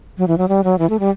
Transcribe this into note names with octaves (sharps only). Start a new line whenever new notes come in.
F#3
E3
F#3
G3
F#3
E3
A3
G3